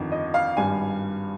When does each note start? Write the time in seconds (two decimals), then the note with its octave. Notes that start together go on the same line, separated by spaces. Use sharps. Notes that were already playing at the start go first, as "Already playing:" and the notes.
Already playing: G1 F2 D#3
0.12 D#5
0.34 F5
0.57 G#1 G2 G3 G#5